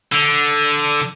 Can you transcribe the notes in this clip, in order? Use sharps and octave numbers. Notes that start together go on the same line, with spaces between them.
D3